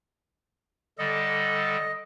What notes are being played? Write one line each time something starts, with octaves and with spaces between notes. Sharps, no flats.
D3 G3 A4 D#5